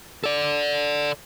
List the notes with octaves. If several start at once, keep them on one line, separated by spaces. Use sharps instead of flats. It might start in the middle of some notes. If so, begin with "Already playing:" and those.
A4 D5